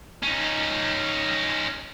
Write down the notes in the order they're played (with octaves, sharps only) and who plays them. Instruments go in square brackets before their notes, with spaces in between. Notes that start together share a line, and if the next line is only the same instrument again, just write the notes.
[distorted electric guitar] C#4 D#4